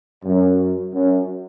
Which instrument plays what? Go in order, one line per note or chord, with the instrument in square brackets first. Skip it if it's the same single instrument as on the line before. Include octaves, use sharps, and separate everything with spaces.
[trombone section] F#2
F#2